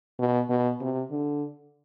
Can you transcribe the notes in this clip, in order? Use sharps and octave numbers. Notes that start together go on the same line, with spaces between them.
B2
B2
C3
D3